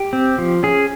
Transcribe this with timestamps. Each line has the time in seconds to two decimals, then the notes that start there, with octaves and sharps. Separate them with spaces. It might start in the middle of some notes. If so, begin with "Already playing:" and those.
Already playing: G4
0.13 C4
0.38 F3
0.63 C#4 G#4